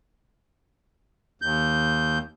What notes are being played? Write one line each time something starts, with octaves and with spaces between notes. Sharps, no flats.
D#2 G6